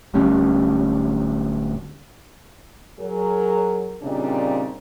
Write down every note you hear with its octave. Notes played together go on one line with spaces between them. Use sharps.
D1 D2 G3 C#4
F#3 G#4 A#4
A#2 C#3 G3 C4 D4 D#4